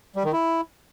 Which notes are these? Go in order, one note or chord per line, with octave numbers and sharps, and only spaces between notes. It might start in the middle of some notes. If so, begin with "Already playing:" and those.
G3
D#3
E4